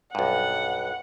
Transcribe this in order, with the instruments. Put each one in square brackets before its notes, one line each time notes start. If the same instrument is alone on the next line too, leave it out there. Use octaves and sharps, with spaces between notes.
[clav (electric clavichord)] B1 G2 [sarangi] F#5